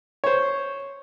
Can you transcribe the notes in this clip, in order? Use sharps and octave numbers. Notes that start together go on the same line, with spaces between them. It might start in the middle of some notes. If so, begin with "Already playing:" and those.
C5 C#5